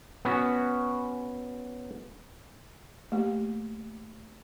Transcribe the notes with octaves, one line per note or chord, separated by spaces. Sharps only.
B3 C#4 F#4
A3 A#3 G4